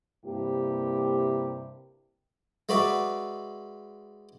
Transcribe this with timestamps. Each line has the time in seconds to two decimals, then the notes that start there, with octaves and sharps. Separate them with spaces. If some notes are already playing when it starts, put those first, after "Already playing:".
0.24 G2 C3 A#3 E4 G4
2.69 G#3 F#4 B4 D5 E5